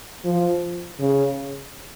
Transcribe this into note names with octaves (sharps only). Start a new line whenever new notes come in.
F3
C#3